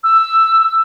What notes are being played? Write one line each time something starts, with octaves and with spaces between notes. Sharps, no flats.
E6